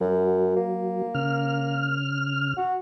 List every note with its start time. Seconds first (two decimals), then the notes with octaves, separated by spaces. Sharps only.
0.01 F#2 F#3
0.56 A#3
1.15 C#3 F6
2.57 F#4